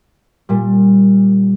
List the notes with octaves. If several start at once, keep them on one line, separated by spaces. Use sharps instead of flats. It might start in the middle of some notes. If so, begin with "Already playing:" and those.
A#2 G3